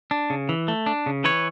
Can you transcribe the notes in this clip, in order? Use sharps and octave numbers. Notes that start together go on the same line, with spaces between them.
D4
C#3
E3
A3
D4
C#3
E3 B4 C#5